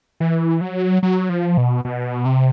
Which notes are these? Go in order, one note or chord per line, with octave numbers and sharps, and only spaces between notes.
E3
F#3
F#3
F3
B2
B2
C3